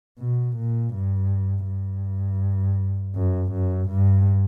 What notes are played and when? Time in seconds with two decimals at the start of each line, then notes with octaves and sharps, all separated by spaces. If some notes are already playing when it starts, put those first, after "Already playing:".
0.19 B2
0.56 A#2
0.94 G2
1.67 G2
3.16 F#2
3.52 F#2
3.89 G2